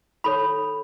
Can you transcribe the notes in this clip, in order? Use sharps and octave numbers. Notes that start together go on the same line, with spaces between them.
D#4 A4 C#5 B5